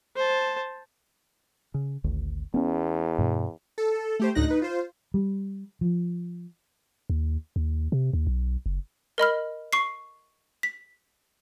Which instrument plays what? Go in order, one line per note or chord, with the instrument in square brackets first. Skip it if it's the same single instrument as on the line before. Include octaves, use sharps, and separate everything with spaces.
[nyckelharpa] C5 A5
[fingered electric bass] C#3
G#1 D2
[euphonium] E2 [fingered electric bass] B3 C#4
[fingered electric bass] G2 B2
[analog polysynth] A4
A3 G4 C5
D2 A2 D3 D#4 F#6 A#6
D#4 B4
F4 C5
[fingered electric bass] G3
F3
[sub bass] D#2
D#2
C3
D#2
B1
F#1
[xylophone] A#4 D#5 B5 F6
C#6 C7
B6